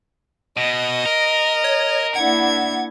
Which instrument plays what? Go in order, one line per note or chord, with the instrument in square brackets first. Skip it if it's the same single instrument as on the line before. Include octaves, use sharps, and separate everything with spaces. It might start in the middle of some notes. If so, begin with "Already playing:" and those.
[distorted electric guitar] B2 [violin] D#5
[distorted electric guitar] A#4
[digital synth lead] C#5
[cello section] A#3 D4 E4 [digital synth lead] F#5 [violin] G#6